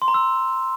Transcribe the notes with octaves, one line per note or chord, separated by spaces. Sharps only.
C6
A#5
E6